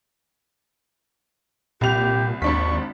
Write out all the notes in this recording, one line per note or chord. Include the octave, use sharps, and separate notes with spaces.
C2 A#2 G4 F7
G#1 D#2 D4 C#6 B6